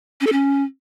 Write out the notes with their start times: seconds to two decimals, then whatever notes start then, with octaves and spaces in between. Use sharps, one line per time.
0.21 C#4
0.27 A4
0.32 C#4